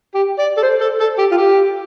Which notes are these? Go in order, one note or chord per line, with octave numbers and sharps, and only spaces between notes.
G4
D5
A4
C5
A4
A4
G4
F4
G4